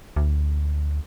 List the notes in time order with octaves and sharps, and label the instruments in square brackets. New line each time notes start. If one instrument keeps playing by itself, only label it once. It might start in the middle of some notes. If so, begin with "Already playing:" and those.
[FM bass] D2